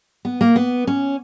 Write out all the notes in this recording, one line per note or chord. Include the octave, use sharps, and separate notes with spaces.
B3
A#3
B3
C#4